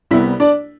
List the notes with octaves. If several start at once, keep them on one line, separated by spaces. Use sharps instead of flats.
C2 C3 G3 B3 E4 E5
D4 D5